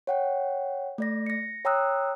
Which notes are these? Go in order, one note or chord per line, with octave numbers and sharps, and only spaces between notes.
C#5 F#5 G5
A3 D5 A#6
A#6 C#7
C#5 G5 A#5 D#6 E6 F#6